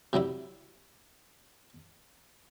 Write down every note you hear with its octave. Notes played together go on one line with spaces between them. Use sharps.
C3 F#3 G3 E4